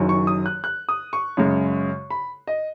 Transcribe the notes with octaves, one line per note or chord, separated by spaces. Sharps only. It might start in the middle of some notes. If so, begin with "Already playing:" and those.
Already playing: F#1 F#2 D#3 F#3
C#6
D#6
F#6
F#6
D#6
C#6
F#2 C#3 G#3
B5
D#5